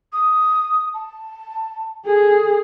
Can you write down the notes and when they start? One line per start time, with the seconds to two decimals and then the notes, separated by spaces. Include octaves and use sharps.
0.13 D#6
0.94 A5
2.05 G#4 A4